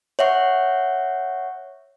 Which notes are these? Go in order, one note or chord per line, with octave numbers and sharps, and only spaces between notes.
C#5 E5 F#5 C#6